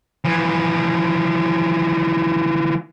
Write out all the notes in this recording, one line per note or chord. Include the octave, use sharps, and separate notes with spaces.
E3 F3